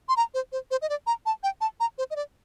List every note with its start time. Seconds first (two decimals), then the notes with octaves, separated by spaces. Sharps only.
0.09 C6
0.17 A#5
0.34 C5
0.52 C5
0.71 C5
0.82 D#5
0.90 D5
1.07 A#5
1.26 A5
1.43 G5
1.61 A5
1.80 A#5
1.98 C5
2.11 D#5
2.16 D5